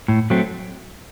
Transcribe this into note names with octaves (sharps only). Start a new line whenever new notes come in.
A2
F#3 A3 C4